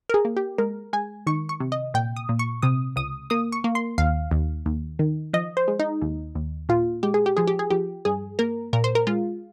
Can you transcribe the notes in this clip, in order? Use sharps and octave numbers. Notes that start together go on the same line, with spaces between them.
A#4
G#4
A#3
G4
G#3 A#4
G#3 G#5
D#3 C#6
C#6
C3
D#5
A#2 G5
D#6
A#2
C#6
C3 D#6
C#2 D#6
A#3 D#6
C#6
A#3
C6
D#2 F5
D#2
D#2
D#3
F3 D#5
C5
G#3
D#4
D#2
D#2
A#2 F4
G#3 G4
G#4
G4
F3 G#4
G4
G#4
F3 G4
G2 G#4
A#3 A#4
A#2 A#4
C5
A#4
G#3 F4